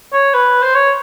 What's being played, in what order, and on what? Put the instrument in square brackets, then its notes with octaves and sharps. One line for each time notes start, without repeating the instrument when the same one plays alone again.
[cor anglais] C#5
B4
C5
C#5